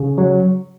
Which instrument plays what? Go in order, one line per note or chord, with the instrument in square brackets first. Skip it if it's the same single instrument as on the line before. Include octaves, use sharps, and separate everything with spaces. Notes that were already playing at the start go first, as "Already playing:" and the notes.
Already playing: [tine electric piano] C#3
F#3